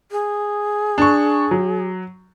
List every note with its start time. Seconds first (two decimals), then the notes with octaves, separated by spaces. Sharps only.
0.12 G#4
0.98 D4 C#6
1.51 F#3